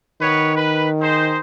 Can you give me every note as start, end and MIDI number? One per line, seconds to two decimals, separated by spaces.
0.21 1.40 51
0.21 0.56 59
0.21 0.56 71
0.21 0.56 73
0.56 0.88 71
1.01 1.39 63
1.01 1.39 68
1.01 1.39 72